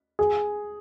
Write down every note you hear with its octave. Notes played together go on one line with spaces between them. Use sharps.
G#4